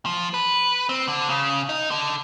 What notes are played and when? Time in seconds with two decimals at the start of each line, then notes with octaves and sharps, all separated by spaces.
0.06 F3
0.34 B4
0.89 C4
1.08 D3
1.30 C#3
1.69 D#4
1.91 D3